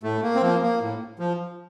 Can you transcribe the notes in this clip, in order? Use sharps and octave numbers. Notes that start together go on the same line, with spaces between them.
A2 A3
A#3
C4
F3 A#3
A#3
A2
F3